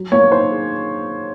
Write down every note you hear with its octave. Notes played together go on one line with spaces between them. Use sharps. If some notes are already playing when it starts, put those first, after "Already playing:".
Already playing: F#3
A#3 C#5
D#4 C5
G#4